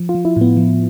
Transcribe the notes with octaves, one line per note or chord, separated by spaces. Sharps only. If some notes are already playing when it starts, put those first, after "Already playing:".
Already playing: F3
F4
F3
E4
A2 B3
F3